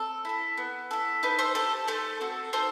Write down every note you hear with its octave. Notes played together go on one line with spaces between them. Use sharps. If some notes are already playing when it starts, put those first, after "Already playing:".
Already playing: C4 A4
E4 A4
B3
E4 A4
D#4 B4
A4 C5
G4 A4
A3 A4 C5
C4 F#4 A4
D#4 A4 C5